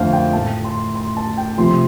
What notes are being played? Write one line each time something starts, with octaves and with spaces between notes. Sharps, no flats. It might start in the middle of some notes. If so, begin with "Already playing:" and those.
Already playing: F2 D3 A3 C5 F5
G5
A2 A3 A5
C6
C6
A5
G5
C3 F3 A3 C6